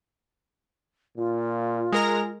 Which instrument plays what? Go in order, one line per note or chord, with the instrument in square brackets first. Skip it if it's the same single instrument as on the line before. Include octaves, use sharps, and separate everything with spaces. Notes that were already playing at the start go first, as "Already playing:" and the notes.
[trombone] A#2 [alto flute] F4
[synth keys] G#3 A#4 A#5